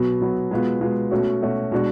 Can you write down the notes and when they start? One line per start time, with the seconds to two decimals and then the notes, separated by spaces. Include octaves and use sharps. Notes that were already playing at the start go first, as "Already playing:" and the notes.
Already playing: B2 F#3 B3
0.21 B2 F#3 B3
0.51 B2 G#3 B3 F4
0.81 B2 G#3 B3 F4
1.11 B2 A3 C#4 F#4
1.42 B2 A3 C#4 F#4
1.72 B2 G#3 D4 F#4